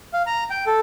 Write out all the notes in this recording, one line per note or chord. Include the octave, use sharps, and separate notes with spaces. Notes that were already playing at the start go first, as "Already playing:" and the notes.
F5
A#5
G5
A4